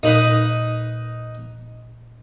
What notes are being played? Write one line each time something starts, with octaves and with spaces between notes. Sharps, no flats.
A#2 D#4 B4 D#5